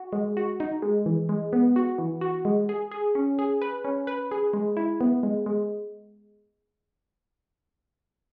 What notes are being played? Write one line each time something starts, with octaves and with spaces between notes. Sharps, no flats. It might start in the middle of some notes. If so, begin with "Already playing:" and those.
Already playing: F#4
G#3
F#4
D#4
G#3
E3
G#3
B3
F#4
E3
F#4
G#3
G#4
G#4
C#4
G#4
B4
C#4
B4
G#4
G#3
E4
B3
G#3
G#3